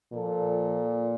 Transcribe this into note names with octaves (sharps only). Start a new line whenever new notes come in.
A#2 F3 A#3 F4 A4